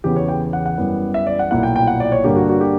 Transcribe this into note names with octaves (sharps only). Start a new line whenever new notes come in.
E2 C#3 E3 B3 G4
C#5
G5
F#5
F#5
F#2 E3 G3 B3
E5
D5
F#5
B1 A#2 A#3 E4 F#5
G5
G5
F#5
D5
C#5
G2 D3 A#3 D4 G4
F#4
F#4
G4